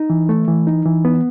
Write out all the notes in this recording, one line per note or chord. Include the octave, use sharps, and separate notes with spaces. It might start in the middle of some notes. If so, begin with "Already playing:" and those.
Already playing: D#4
E3
A3
E3
D#4
E3
B3